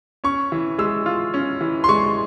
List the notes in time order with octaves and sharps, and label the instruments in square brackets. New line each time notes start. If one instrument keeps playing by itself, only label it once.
[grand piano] C#4 C#6
E3
G#3 E6
F4
C#4
E3
C6
G#3 C#6